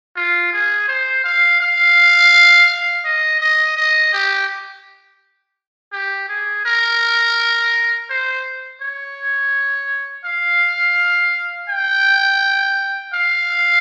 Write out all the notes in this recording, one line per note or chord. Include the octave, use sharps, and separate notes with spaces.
F4
G#4
C5
F5
F5
D#5
D#5
D#5
G4
G4
G#4
A#4
C5
C#5
F5
G5
F5